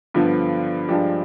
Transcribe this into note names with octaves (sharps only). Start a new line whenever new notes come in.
G2 D3 F3 B3
G2 F3 G#3 D4 G4